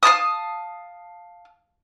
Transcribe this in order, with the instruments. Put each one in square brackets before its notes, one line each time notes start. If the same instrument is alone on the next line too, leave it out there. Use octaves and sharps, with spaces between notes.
[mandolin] F5 G#5 A5 D#6